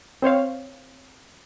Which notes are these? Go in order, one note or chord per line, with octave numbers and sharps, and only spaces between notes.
C4 C5 C#5 F5